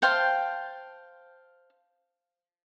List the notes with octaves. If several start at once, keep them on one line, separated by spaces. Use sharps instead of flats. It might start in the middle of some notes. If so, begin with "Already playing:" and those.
C5 F5 G5 A5